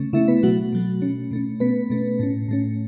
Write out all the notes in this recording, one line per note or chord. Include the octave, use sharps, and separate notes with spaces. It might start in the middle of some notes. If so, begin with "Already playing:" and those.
Already playing: C#3 A3 C#4
C#3 A3 C#4 E4 E5
B3 B4
B2 F#3 A3 F#4
B2 F#3 A3
B2 A3 C#4
B2 A3 C#4
B2 A3 B3 C#4 B4
B2 A3 C#4
A2 A3 C#4
A2 A3 C#4